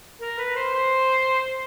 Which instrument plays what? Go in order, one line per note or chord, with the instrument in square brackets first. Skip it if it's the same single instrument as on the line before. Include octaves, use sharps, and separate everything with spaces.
[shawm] A#4
B4
C5
C5